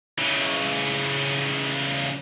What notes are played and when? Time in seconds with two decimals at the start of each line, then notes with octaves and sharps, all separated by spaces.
0.18 C#3 E3